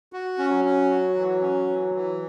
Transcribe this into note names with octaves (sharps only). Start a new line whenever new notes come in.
F#4
C#4
F#3
C#4
F#4
E3
C#4
E3
E3